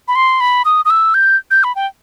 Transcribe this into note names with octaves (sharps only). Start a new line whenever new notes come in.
B5
C6
B5
D#6
D#6
E6
G6
G6
B5
G5